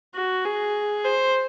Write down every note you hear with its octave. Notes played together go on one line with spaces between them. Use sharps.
F#4
G#4
C5